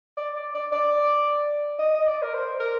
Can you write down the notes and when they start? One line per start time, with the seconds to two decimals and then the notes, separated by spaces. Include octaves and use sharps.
0.17 D5
0.36 D5
0.54 D5
0.72 D5
1.79 D#5
1.94 D#5
2.06 D5
2.22 A#4
2.34 C5
2.60 A#4